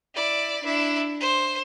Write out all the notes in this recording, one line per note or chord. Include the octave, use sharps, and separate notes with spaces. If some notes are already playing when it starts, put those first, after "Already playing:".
E4 D5
D4 E4
C5